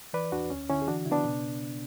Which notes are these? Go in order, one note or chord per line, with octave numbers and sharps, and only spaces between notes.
E3 B4 D5
E2 D4 F#4
D2 C#4
D3 C#4 E4
G#4
E3 D4 F#4
C#3 E4
B3 D4
B2